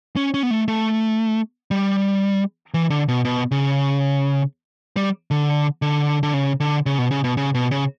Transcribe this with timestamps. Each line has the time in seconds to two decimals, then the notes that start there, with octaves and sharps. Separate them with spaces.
0.16 C#4
0.34 C#4
0.43 B3
0.51 A3
0.68 A3
1.71 G3
2.74 E3
2.90 D3
3.08 B2
3.25 B2
3.51 C#3
4.96 G3
5.31 D3
5.82 D3
6.23 D3
6.34 C#3
6.60 D3
6.86 C#3
6.98 B2
7.11 C#3
7.24 B2
7.37 C#3
7.55 B2
7.71 C#3